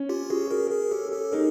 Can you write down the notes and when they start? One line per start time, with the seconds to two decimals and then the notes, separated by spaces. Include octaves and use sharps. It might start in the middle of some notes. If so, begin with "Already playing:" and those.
Already playing: C#4
0.09 F4 G4
0.30 F#4 G#4
0.51 G#4 A#4
0.71 G#4 A#4
0.91 G4 A4
1.12 G4 A4
1.32 D#4 G#4 A#4